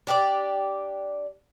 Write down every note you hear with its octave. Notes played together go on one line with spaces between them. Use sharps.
D4 G4 A4 D5